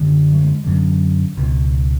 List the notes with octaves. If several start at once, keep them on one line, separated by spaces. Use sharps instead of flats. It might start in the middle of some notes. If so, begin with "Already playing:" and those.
Already playing: F#2 D3
F#3
G#3
F#2 D3
C#2 B2